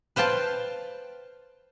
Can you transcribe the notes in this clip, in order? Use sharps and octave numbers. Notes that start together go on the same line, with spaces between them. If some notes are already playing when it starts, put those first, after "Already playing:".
B4 C5 F5 G5 A5